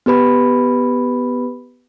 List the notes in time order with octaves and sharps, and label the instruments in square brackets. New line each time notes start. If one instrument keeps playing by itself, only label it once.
[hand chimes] B3 G4 B4 B5